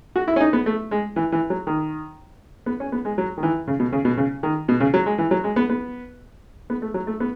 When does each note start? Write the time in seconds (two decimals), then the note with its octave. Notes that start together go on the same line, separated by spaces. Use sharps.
0.16 F#4
0.28 E4
0.36 C#4
0.40 D#4
0.53 B3
0.66 A3
0.91 G#3
1.16 E3
1.32 E3
1.50 F#3
1.67 D#3
2.66 B3
2.80 C#4
2.92 B3
3.05 G#3
3.18 F#3
3.38 D#3
3.43 E3
3.67 C#3
3.80 B2
3.92 C#3
4.05 B2
4.17 C#3
4.43 D#3
4.68 B2
4.80 C#3
4.94 F#3
5.06 G#3
5.18 E3
5.31 F#3
5.44 G#3
5.56 B3
5.70 B3
6.70 B3
6.82 A3
6.94 F#3
7.07 A3
7.20 B3